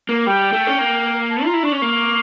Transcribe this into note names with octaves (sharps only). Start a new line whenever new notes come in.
A#3
G3 G5
A3
C#4
A#3
A5
F4 A#5
E4
D4 C#6
C#4
A#3